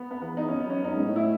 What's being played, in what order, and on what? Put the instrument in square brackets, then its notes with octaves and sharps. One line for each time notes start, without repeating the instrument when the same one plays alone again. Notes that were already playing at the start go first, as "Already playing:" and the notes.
Already playing: [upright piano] B3
B3
[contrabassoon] E2 [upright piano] B3
[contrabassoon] E2 [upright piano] D#4
[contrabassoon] F#2 [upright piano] C#4
[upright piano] B3
C#4
[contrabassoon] F#2 [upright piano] D#4
[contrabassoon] G#2
A2
[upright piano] E4